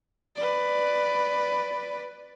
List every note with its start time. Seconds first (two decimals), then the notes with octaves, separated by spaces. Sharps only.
0.36 B4 D5